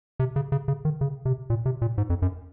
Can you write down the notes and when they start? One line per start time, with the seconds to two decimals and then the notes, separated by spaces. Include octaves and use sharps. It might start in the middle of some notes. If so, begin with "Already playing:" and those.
0.20 C3
0.36 C#3
0.52 C#3
0.68 C#3
0.85 D#3
1.01 C#3
1.25 C3
1.50 A#2
1.66 C3
1.82 A#2
1.98 G#2
2.10 F2
2.22 F#2